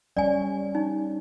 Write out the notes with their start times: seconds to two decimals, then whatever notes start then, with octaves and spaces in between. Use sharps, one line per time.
0.17 G3 C#4 D5 G#5
0.75 D#4